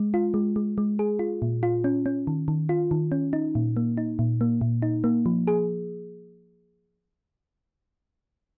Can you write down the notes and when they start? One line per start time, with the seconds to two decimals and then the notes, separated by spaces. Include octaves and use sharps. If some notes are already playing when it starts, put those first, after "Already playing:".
Already playing: G#3
0.14 F4
0.34 G#3
0.56 G#3
0.78 G#3
0.99 G#4
1.19 F4
1.42 A#2
1.63 F4
1.84 C#4
2.06 C#4
2.27 D#3
2.48 D#3
2.69 F4
2.91 D#3
3.12 C#4
3.33 D#4
3.55 A#2
3.77 A#3
3.97 D#4
4.19 A#2
4.41 A#3
4.61 A#2
4.82 D#4
5.04 A#3
5.26 F3
5.47 G#4